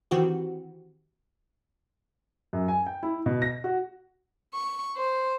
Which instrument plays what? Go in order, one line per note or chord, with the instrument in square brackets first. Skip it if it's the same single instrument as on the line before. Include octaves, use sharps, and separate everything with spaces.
[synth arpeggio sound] D#3 E3 C4 F#4 G4
[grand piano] F#2
G#5
G5
E4
B2
A#6
F#4
[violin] C#6
C5